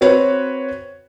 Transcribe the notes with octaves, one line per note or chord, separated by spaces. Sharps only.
C4 F#4 B4 C#5